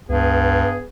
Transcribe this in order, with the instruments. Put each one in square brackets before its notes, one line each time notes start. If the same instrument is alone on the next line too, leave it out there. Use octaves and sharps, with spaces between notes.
[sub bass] C#2 [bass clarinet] G2 [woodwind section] B3 G#4